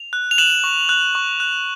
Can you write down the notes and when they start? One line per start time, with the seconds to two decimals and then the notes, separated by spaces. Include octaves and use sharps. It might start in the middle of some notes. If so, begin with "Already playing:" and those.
Already playing: F7
0.13 F#6
0.31 F7
0.38 F#6 E7 F#7
0.64 C#6
0.89 F#6
1.15 C#6
1.40 F#6